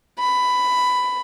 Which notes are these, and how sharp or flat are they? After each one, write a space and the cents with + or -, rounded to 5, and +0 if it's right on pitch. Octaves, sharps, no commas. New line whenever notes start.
B5 +10